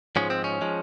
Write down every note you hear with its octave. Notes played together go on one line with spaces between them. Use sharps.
G#2 F3 G#3 C#4
C4
C#4
F3 G#3